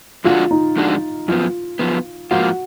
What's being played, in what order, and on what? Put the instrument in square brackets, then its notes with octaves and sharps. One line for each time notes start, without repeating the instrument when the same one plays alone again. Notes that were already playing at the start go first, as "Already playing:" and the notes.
[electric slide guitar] F2 D3 G#3 D4 F#4 [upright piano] F4
[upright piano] D#4
[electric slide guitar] F2 D3 G#3 D4 F#4
[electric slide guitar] F#2 F3 B3 [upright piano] F4
[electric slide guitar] F#2 F3 B3
[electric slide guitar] G#2 F3 A#3 F4 [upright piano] F#4